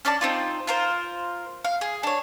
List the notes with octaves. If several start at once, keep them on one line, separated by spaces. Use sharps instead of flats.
C#4 D4 D5 A5
C4 D#4 F4
F4 A#4 C5
F5
G#4
D4 C#5